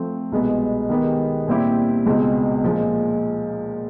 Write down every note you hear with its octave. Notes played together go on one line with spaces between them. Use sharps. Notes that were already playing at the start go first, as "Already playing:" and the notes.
Already playing: F3 A3 C4
C2 B2 G#3 B3
D#3 G#3 B3 D#4 G4
A#2 G3 C4 E4 G4
C#2 B2 G#3 C4
A#2 F3 G#3